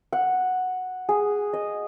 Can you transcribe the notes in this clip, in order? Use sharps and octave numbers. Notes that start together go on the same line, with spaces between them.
F#5
G#4
D#5